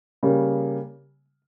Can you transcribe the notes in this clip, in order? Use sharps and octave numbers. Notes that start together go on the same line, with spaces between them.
C#3 G3 A#3